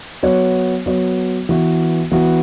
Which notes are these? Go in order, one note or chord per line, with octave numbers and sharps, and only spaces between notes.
F#3 B3 F#4 C#5
F#3 B3 F#4 C#5
E3 B3 F#4
E3 B3 F#4